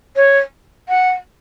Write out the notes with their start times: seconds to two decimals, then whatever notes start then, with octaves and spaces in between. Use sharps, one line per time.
0.16 C#5
0.89 F#5